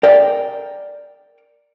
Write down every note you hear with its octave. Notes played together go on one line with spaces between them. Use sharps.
A#4 D5 G5